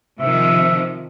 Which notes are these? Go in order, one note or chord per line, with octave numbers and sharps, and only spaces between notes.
C3 D#3 F3 E5